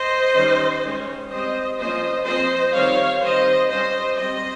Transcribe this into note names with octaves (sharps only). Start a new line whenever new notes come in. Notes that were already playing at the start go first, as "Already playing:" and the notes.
Already playing: C5 D#5
D#3 G3 C#4
D#3 G#3 C#4
G3 C4 C5 D#5
F3 A#3 C#4 C5 D#5
F3 C4 C5 D#5
D#3 G3 C4 C#5 F5
D#3 G3 C4 C5 D#5
G3 C#4 C5 D#5
G3 C4 C5 D#5